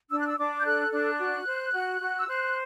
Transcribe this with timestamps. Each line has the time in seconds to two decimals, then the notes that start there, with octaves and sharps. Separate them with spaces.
0.10 D4 E6
0.19 F#6
0.27 E6
0.38 D4 D6
0.60 G6
0.65 A4 F#6
0.91 D4 F#6
1.19 F#4
1.46 C5
1.73 F#4
2.01 F#4
2.17 E6
2.28 C5 F#6